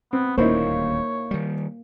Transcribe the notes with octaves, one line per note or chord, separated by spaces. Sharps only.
B3 C4
D#1 D2 A#2 A#3 D#4 E4 C5 C#5
D#3 G3